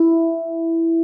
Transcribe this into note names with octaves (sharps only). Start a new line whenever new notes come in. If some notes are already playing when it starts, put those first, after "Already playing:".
Already playing: E4